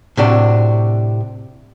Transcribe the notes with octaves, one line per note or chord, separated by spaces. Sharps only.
A2 C3 D4 F#4